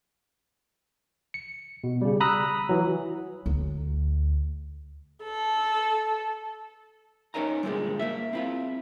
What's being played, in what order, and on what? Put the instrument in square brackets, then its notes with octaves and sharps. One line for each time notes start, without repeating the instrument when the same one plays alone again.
[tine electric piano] C#7
B2
C#3 G3
A#5 B5 D#6 E6 F#6
E3 F#3
[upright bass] D2
[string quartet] A4
[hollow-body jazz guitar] C#4 D#4 A#4 C#5 G#5 A#5
G2 A#2 D3 E3 F3 G#3
A#3 E5
C4 E4 F4